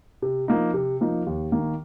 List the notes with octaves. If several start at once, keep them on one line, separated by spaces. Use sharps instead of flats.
C3
F3 A#3 D#4
C3
F3 A#3 D#4
D#2
D#3 A#3